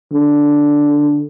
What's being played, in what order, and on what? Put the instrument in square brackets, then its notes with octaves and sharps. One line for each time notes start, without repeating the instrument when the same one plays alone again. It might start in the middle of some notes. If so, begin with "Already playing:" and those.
[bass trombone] D3